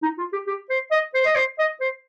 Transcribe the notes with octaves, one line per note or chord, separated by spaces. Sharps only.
D#4
F4
G4
G4
C5
D#5
C5
D#5
C5
D#5
C5